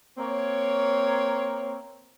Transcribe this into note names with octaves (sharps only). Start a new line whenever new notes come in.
A#3 C4 C#5